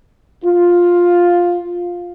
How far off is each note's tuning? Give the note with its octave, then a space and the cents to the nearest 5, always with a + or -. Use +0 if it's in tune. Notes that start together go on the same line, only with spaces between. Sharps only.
F4 +5